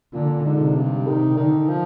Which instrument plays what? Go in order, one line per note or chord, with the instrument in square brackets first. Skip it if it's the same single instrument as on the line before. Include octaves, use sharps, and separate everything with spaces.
[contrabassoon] A#2 [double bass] D3
[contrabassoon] G#2
[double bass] C3
[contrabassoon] G2
[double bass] C3 [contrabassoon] D#3
[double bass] D3 [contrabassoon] D#3
[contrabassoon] F3